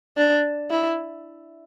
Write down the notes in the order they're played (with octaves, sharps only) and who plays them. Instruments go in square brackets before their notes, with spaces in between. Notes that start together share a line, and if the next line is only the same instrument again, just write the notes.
[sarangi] D4
E4